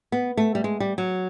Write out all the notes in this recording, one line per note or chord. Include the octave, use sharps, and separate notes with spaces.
B3
A3
G3
G#3
G3
F#3